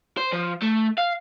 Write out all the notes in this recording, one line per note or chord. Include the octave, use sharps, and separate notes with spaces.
C5
F3
A3
F5